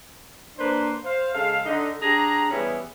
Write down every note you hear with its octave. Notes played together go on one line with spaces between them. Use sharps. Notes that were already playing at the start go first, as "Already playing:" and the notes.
A#3 D4 B4 C5
C5 F5
C#3 G#3 A4 F5
D3 D#4
D4 G4 G#4 A#5
E3 G3 B3 C#4 E4 G#4